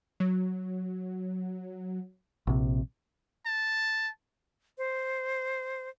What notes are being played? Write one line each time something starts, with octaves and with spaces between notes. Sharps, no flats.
F#3
A#1 C3
A5
C5